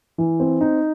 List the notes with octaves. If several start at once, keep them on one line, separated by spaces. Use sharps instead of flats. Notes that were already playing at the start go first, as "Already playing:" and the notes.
E3
C4
D#4